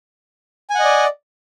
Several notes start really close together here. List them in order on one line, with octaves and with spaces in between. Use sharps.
G#5 F#5 D#5 D5